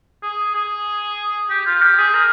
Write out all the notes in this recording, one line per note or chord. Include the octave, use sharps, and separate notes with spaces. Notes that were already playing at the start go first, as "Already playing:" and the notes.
G#4
G#4
G4
F4
G4
G#4
A#4